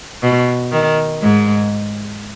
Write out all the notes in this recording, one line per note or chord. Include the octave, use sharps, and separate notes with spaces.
B2
D#3
G#2 G#3